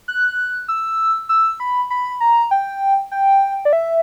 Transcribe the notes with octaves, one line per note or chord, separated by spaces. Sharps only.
F#6
E6
E6
B5
B5
A#5
G5
G5
D5
E5